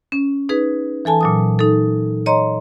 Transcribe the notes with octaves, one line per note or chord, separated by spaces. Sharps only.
C#4
D#4 G#4 B4
E3 A4 G#5 A5
A#2 F#3 D#6
D#4 A4
C#5 D#5 A#5 C6